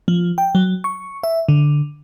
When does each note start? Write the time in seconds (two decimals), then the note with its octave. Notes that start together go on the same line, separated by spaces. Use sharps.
0.08 F3
0.38 G5
0.55 F#3
0.84 C#6
1.23 E5
1.49 D3